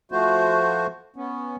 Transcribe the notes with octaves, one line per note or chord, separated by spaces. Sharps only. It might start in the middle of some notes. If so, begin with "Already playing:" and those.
F3 A3 F#4 C5
B3 C#4